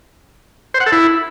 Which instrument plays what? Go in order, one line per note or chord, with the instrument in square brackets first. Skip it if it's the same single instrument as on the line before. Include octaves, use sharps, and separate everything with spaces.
[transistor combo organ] C5
F#5
A4
E4